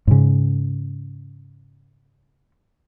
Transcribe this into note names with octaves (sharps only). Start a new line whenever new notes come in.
G#2 C#3